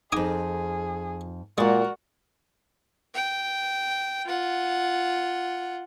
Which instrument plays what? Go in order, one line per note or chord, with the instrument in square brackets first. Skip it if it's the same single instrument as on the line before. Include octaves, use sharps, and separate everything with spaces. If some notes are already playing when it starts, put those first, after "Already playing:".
[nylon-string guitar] F2 D#4 [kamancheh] G#4 [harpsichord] G#5 D6 D#6
[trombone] A#2 [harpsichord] G#3 [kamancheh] F#4 A#4 [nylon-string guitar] D5 F#5
[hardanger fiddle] G5
F4 F#5